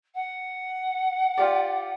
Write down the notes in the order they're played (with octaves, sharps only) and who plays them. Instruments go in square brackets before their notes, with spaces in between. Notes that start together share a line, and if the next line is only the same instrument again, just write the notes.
[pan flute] F#5
[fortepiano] F4 G4 D5